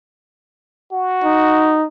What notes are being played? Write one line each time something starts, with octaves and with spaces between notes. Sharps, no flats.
F#4
D#4